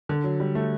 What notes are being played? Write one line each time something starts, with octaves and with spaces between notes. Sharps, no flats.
D3
F#3
G3
A3